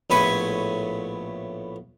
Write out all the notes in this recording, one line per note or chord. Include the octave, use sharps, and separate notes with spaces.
A#1 A2 B3 G#5 B5 C#6